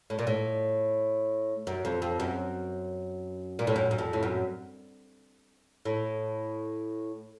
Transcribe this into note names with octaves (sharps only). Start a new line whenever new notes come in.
A2
A#2
A2
F#2
F2
F2
F#2
A#2
A2
F#2
F#2
F2
A2
F#2
A2